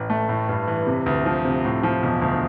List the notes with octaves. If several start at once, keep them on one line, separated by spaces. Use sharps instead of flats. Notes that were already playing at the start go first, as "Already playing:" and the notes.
Already playing: A1
A3
A2
G2
E3
C3
D2
F3
C3
A2
F3
E1
D2